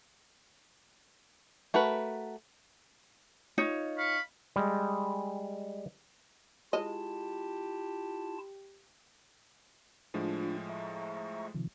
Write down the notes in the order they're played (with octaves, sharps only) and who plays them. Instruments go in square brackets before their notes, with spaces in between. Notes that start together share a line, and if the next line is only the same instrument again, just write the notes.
[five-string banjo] A3 F#4 A#4 B4
[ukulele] D#4 F4 C#5
[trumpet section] F5 B5 C#6
[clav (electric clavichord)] G3 G#3
[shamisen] G#3 D#5 [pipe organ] E4 F4 A5 [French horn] G4
[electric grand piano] A2 F3 G#3 [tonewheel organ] D4 F4
[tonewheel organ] E5 A#5 C#6
C3 D#3 F3